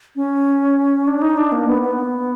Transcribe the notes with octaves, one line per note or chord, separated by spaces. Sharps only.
C#4
D4
D#4
D4
A#3
B3
B3